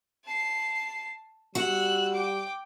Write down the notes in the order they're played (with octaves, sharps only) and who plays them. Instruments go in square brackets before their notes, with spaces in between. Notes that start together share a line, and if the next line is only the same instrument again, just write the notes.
[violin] A5 C7
[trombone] G3 [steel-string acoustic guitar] F#4 [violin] E6 F#6
[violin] G5 D6